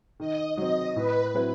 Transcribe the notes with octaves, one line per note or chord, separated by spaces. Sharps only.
D#3 D#5
F#3 C4 D#5
A2 B4
F#3 C4 E4 B4